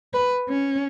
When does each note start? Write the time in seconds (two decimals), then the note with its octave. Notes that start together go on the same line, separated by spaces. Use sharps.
0.14 B4
0.49 C#4